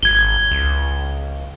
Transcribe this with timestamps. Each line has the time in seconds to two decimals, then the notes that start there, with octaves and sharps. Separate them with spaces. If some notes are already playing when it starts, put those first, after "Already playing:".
0.03 G#1 G#6 G7
0.51 C#2